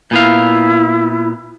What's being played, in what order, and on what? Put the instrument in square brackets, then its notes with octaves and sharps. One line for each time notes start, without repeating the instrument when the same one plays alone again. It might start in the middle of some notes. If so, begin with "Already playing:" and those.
[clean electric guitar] A#2 B3 F5 [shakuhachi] E4